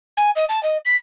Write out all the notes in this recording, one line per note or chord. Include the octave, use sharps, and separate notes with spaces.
G#5
D#5
A5
D#5
B6